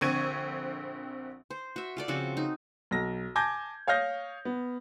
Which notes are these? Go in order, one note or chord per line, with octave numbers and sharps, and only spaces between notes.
A#1 D3 C4 C#6 G#6 D#7
C5
F#4 E5
F4 A4 D5
C#3 F3 C4 F#4
D#4
B1 A#6
G#5 A5 D6 G6 G#6 A#6
C#5 F5 D#6 F6 G6 A#6
B3